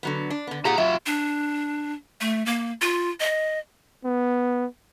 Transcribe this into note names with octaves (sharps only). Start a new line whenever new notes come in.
D3 F#3 B3
D4
D3 B3
F4 G4 G#4 F#5 A#5
F#3 F4 E5
D4
A3
A#3
F4
D#5
B3